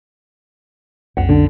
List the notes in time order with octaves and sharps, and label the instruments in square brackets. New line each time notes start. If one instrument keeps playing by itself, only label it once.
[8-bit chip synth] B1 F2 [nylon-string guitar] F#5
[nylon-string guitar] D3